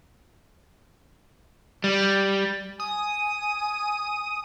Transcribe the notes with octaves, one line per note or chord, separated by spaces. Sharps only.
G3
G#5 D#6